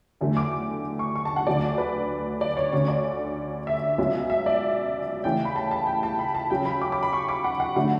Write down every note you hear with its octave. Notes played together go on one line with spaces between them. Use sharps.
E2 D3 F#3 A3
D6
C#6
C#6
A5
F#5
D2 D3 F#3 A3 D5
B4
D5
C#5
D2 D3 A3 C#4 C#5
D5
E5
C#2 B2 F#3 C#4
E5
D5
C#3 E3 A3 C#4 G5
B5
A5
A5
G5
A5
B5
A5
C#3 F#3 C#4 G5
B5
D6
D6
B5
C#6
D6
F#5
F#5
D3 F#3 A3 D4 F#5